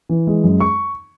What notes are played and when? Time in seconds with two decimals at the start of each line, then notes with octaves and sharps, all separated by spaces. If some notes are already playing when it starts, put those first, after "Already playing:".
0.09 E3
0.27 G#3
0.44 F#2
0.60 C#6